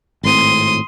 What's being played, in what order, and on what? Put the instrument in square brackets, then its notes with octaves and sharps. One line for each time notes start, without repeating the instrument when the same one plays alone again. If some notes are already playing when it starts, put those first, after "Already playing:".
[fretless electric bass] G#1 A2 C4 [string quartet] C6 D#6